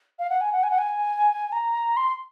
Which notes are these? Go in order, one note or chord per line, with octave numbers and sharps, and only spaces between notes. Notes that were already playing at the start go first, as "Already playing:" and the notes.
F5
F#5
G#5
F#5
G#5
F#5
G#5
A#5
C6